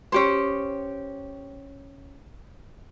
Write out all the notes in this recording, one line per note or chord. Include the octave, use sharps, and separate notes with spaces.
C#4 G4 C5